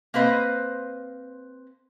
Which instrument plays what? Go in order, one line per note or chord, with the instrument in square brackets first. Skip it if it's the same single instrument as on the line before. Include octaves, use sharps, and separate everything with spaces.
[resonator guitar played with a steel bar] A#3 C4 B4 C5 D#5